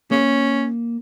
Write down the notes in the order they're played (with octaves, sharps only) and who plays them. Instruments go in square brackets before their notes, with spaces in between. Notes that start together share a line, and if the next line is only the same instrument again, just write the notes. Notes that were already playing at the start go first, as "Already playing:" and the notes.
[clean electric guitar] A#3 [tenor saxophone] C#4